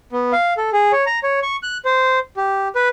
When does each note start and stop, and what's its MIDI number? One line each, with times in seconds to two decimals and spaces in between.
0.12 0.32 59
0.32 0.53 77
0.57 0.70 69
0.73 0.92 68
0.92 1.05 73
1.06 1.19 82
1.23 1.40 73
1.43 1.56 85
1.63 1.77 90
1.85 2.19 72
2.37 2.68 67
2.75 2.89 71